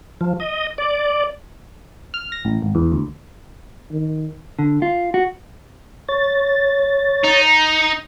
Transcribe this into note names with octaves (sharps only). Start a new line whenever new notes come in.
F3
D#5
D5
F6
A#6
A1
G#1
E2
D2
D#3
D3
F4
F#4
C#5 A6
D#4